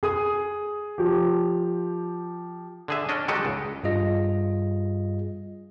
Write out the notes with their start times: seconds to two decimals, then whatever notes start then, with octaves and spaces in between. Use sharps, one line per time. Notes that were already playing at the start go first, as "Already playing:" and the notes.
0.03 G#4 D#6
0.98 F3 G4
2.88 D3 G#4 E5
3.09 C#4 D4 D#5
3.28 D#3 G#3 F#4 G4 A4 D#5
3.45 C#2
3.83 G2 G3 F4 G#4 D#5 A#6